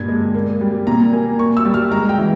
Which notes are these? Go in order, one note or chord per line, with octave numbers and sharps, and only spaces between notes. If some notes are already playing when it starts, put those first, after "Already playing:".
Already playing: G2 A#2 G#6
G#3
A#3
G3
A#2 A#5
A#3 G#5
A#3 C#6
E6
G3
F6
G#3 A#5
G5
E3